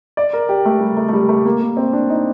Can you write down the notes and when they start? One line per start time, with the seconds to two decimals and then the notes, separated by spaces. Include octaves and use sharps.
0.17 D5
0.33 A#4
0.49 G4
0.65 A3
0.81 G3
0.97 A3
1.08 A3
1.13 G3
1.29 A3
1.45 A#3
1.61 A#3
1.77 C4
1.93 D4
2.10 D#4